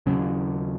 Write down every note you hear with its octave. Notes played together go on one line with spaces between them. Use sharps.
D#2 C#3 F#3 C#4